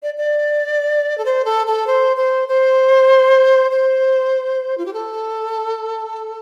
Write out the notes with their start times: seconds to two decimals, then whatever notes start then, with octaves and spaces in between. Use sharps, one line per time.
0.03 D5
0.18 D5
1.18 A4
1.25 C5
1.45 A4
1.67 A4
1.87 C5
2.17 C5
2.48 C5
3.71 C5
4.78 F4
4.86 G4
4.93 A4